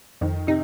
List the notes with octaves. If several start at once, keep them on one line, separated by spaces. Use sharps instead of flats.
F2 D#3
C3 D#4